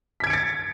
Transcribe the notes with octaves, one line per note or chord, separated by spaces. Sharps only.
G#6 A6 B6 C#7 D7